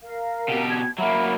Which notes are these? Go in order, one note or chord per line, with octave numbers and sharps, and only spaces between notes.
A#4 F5
B2 G4
G#6
F#3 A#3 E5 F#5 B5